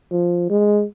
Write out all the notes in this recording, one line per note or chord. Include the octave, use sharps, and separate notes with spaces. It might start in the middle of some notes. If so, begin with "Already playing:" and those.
F3
G#3